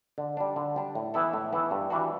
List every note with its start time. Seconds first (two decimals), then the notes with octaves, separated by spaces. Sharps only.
0.18 D3
0.37 G3 D4
0.56 D3
0.76 G3 D4
0.95 A2
1.14 E3 B3 E4 A4
1.33 A2
1.53 E3 B3 E4 A4
1.71 G2
1.90 E3 G3 D4 F#4